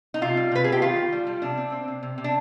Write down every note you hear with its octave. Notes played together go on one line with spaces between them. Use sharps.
D#4
C3 F4
G3
C3 B4
G#4
C3
G4
D#3 F4
D#3
G3
G3
C3 D4
C4
C4
C3
C3
C3
D4